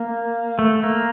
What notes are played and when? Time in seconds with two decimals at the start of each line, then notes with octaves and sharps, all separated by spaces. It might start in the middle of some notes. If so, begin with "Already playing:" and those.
Already playing: A#3
0.59 A3
0.83 A#3